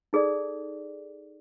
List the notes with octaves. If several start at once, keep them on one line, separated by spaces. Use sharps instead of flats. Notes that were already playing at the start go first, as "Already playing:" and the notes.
D#4 G#4 A4 D5